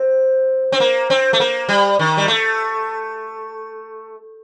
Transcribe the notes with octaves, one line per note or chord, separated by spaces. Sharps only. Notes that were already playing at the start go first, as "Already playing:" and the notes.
Already playing: C4
C4
A#3
C4
A3
A#3
G3
D#3
G3
A3